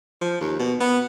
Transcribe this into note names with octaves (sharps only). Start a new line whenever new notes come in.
F3
D#2
B2
B3